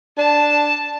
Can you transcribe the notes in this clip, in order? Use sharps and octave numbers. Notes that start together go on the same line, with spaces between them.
D4 A5